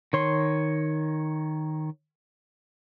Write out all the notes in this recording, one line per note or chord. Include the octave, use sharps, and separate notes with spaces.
D#3 C#5 C6